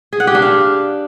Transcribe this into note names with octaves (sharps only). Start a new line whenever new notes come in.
G#4
F#5
G4
D4
F5